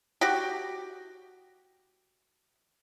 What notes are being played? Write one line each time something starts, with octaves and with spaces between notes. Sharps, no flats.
F#4 G4